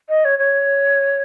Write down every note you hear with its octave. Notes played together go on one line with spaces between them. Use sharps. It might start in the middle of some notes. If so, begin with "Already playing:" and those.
D#5
C#5
C#5